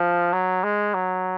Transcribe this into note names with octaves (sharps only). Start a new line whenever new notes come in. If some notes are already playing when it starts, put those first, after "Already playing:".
Already playing: F3
F#3
G#3
F#3